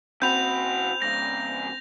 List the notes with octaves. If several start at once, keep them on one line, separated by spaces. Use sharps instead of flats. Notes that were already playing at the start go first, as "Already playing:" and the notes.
C#3 C4 F#4 B5 G6 F7
G#2 C#3 A#6